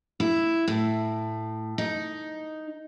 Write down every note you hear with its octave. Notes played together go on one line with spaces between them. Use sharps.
E4
A2
D#4